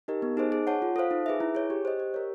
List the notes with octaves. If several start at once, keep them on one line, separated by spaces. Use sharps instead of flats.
D#4 G4 A#4 D#5
B3
D#4 G#4 C5 D#5
G#4
C#5 F#5 A5
F4
A4 C5 F5
D#4
G#4 B4 E5
E4
G#4 C#5
G4
C5 D#5
G4
A#4 C#5